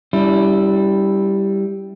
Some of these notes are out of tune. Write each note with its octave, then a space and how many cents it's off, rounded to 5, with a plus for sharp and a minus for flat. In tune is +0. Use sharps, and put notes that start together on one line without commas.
G3 +0 C#4 +45 E4 +0